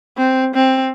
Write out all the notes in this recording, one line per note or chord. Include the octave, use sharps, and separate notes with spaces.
C4
C4